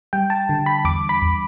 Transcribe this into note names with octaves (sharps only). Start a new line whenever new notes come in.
G3 G5
A5
D3
B5
E2 D6
B5
E2